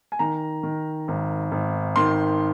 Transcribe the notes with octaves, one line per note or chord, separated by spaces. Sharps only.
G#5
D#3 A#5
D#3
G#1
G#1
D#3 C6